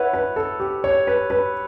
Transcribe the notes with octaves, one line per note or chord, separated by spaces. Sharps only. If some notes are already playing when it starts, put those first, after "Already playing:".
Already playing: E4 B4 C#5 F#5
B4
A4
G4
C#5
B4
B4